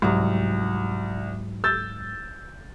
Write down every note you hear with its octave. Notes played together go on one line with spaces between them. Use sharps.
C2 G#2 F#3
E6 G6 A6